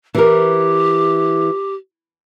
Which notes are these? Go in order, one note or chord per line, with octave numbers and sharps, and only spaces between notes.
E3 G4 A#4